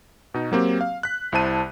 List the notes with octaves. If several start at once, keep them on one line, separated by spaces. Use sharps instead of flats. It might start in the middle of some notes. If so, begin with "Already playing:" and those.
B2 D#4
F#3 A#3 C4 G4
F5
F#6 B6
C2 E4 C5 A5 D#7